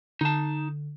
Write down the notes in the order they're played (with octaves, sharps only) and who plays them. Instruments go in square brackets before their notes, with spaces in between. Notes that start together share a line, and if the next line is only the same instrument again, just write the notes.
[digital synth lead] D3 [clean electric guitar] D#4 A5